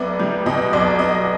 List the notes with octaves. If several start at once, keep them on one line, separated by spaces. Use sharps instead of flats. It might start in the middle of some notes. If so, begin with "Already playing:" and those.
Already playing: B1 B3 D5 E5
G3
B2 D#5
B1 D5
B3 D#5